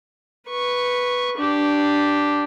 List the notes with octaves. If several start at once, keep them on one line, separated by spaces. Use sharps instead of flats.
B4 C#6
D4 G4